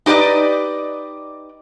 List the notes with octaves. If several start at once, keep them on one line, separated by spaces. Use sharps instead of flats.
D#4 G4 B4 D5 D#5